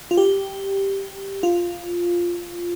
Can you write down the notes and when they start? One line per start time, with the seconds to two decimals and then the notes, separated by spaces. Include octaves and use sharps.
0.11 F4
0.17 G4
1.43 F4